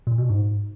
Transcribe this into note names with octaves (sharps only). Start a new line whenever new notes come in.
A#2
B2
G#2